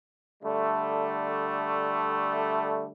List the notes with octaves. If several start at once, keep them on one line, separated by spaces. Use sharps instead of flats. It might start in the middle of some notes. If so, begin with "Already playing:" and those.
D3 G3 A3